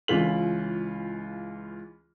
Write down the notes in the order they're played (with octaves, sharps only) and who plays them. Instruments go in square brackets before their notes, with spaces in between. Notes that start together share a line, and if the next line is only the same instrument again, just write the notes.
[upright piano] C#2 E3 C#4 F4 B6 F#7